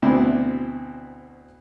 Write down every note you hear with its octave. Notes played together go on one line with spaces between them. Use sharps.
D2 B2 C4 D4 E4